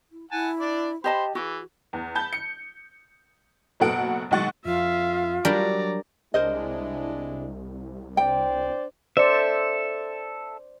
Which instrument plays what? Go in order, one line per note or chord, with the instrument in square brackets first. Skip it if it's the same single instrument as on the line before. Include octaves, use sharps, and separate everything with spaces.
[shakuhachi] E4
[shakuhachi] E4 [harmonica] F#5 G#5 A5
[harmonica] D4 D5
[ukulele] G4 D#5 A5 [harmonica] C5 B5
[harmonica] E3 [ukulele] F#4 [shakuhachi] G#4
[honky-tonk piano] E2
A5 B5 G6
C#7
F#1 B2 B3 A4 F#5 D7
B1 D#3 G#3 F#5 C#6 A6
[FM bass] F2 [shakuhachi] F4 [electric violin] E5 F5
[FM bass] F#3 [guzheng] G3 D4 A#4 [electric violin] D5 A#5
[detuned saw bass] C2 [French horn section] G#3 D4 E4 [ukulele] A#4 C5 D#5
[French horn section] D4 C5 D5 [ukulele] G5
[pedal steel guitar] A4 E5 [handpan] C5 D5